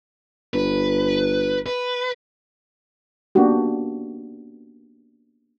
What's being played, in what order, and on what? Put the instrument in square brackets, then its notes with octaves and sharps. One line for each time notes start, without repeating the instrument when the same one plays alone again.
[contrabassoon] G1 [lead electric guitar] B4
[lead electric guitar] B4
[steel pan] A#3 B3 C#4 D4 F#4 G4